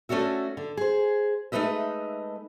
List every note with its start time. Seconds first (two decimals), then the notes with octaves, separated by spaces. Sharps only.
0.09 A3 C#4 D4 F#4 E5
0.57 D3
0.77 G#4 C5
1.52 G#3 A3 D#4 B4 D#5 E5